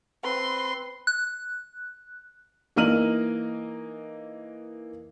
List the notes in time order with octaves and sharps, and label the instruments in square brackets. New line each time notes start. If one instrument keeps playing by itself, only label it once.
[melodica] C4 B4 [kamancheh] C6
[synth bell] F#6
[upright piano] E3 A#3 D#4 F6 D#7 F#7